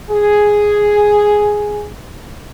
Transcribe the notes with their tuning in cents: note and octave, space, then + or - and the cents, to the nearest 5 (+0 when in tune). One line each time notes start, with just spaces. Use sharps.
G#4 +0